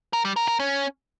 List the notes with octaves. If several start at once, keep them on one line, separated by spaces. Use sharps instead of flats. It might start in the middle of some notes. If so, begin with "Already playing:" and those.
A#4
G3
A#4
A#4
C#4